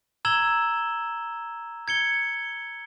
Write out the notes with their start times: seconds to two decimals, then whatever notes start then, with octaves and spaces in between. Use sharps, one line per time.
0.25 A#5 E6 G#6 E7 F#7 G7
1.88 G#6 C#7 G7